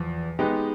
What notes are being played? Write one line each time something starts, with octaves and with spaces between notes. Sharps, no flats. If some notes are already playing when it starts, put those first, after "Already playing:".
Already playing: E2 F3
G#3 B3 D#4 G4 B4